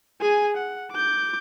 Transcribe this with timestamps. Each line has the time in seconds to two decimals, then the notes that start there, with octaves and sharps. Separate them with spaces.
0.21 G#4 G#5
0.57 F#5
0.93 D6 G6